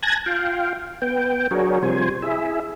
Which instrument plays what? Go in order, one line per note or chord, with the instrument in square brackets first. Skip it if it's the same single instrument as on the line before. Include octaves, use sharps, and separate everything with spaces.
[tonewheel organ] G#5 A5 F#6 G#6 A#6
F4 F5 G5
B3 G5
F#3 D4 F#4 G#4 A#4 C#5
C3 F3 G3 C5 G#5
E4 G#4 E5